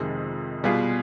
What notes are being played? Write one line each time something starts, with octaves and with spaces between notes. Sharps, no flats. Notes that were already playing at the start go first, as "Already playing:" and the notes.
Already playing: F2 C3 D#3 G#3
B2 G3 B3 F4 G#4